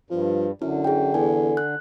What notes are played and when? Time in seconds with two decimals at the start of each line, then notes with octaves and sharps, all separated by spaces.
0.10 G2 F3
0.62 F#2 D3 E4
0.84 G#4 G5
1.14 E2 A4 G#5
1.57 F#6